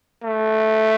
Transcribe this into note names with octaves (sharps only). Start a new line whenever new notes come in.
A3